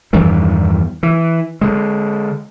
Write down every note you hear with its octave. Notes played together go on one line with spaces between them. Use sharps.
E2 G2 D#3 E3
E3
D3 G#3